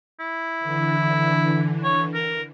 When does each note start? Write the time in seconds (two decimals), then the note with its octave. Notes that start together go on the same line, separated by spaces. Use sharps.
0.20 E4
0.60 D3 E3
1.84 C#5
2.14 A#4